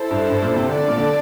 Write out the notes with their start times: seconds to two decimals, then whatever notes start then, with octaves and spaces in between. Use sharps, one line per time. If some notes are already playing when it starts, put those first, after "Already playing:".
Already playing: E4 A4 C5
0.11 G2
0.30 G2
0.43 A#2
0.56 C3
0.68 D3 D4 A4 D5
0.88 A#2
0.98 D3